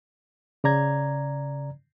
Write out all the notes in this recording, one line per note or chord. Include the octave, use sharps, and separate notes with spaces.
C#3 D5 A#5 G#6